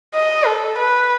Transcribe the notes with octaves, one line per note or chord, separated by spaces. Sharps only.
D#5
A4
B4